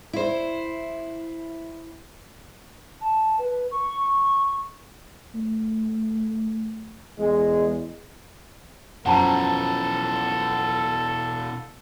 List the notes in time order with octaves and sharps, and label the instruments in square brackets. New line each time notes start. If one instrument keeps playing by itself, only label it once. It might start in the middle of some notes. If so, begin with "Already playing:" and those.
[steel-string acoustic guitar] E4 C5
[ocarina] A5
B4
C#6
[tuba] A3
[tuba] E2 [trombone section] G#3
[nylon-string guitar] F#2 F3 [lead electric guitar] B2 E3 [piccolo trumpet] A4 [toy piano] F#5 A5 A#5